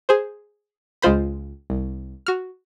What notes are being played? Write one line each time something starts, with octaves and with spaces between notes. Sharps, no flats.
G#4 C5
C#2 G#3 F4 C5 B5
C2
F#4 F6